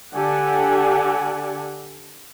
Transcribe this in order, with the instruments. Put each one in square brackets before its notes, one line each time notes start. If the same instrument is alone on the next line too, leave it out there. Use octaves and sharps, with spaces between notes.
[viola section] D3 G4 A4 D5 F#5 G#5